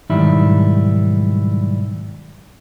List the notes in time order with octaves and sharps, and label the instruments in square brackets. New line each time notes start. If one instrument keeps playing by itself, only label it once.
[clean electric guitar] B1 G#2 D#3 G3 E4